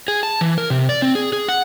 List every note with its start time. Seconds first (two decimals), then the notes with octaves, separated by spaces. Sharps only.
0.08 G#4
0.23 A5
0.41 E3
0.58 A#4
0.70 C3
0.89 D5
1.02 C4
1.15 G#4
1.33 G#4
1.48 F#5